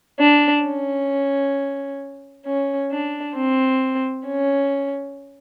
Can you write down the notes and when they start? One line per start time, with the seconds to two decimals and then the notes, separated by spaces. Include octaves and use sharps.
0.19 D4
0.64 C#4
2.45 C#4
2.91 D4
3.35 C4
4.26 C#4